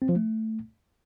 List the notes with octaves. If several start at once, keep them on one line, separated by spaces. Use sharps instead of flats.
C4
F3
A3